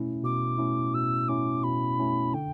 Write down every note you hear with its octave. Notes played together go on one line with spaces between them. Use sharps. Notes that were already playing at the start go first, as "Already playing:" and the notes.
Already playing: B2 A3 C#4 E4
B2 D6
A3 C#4 E4
B2 E6
A3 C#4 E4 D6
B2 B5
A3 C#4 E4
D3 G5